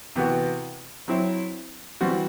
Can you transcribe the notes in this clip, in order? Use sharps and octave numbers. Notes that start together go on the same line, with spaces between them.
C3 E3 B3 F#4
F#3 C4 E4
E3 G3 C4 F#4